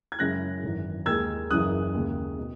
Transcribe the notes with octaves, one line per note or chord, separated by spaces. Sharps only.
G#6
F#2 C#3 G#3 C#4 E4 F#6 A#6
G#1 F#2 E3
D#2 D#3 G#3 E6 G#6
F#1 F#2 C#3 E3 D#6 F#6
D#2 C#3 G#3
B2